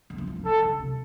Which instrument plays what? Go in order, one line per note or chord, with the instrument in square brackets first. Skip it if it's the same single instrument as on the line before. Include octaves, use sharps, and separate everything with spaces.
[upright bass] D3
E3
F3
E3
[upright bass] D#3 [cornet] A4
[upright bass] D3
C3